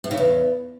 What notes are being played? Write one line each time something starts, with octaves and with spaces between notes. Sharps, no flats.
A2
C#3
E2